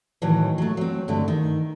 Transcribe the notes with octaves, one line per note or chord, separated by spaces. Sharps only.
A2 D#3 E3 F#3
F#3 A3
F#3 C4
G2 D3 A3
D#3